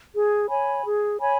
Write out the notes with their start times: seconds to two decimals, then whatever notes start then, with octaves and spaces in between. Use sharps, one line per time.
0.14 G#4
0.49 C#5 G#5 B5
0.84 G#4
1.20 C#5 G#5 B5